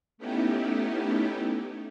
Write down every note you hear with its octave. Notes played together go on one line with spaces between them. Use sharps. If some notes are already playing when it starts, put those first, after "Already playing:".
A3 B3 C#4 D#4 E4 G4